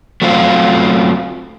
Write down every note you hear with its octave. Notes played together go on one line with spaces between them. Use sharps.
F#3 A3 C4 F4